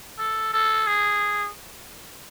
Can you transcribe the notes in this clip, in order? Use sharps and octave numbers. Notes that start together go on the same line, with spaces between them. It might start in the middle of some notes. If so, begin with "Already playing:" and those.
A4
A4
G#4